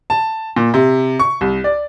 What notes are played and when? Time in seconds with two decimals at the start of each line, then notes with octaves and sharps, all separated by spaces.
0.10 A5
0.56 A#2
0.74 C3
1.19 C#6
1.41 C2
1.64 D5